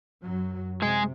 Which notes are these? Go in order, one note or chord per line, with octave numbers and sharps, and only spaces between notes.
F#2 F#3
C3 G#3 G#4